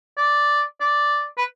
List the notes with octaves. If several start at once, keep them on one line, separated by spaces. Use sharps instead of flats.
D5
D5
B4